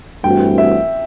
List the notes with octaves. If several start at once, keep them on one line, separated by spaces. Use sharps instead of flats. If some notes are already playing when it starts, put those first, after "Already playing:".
G2 E3 A3 C4 F#4 G5
E5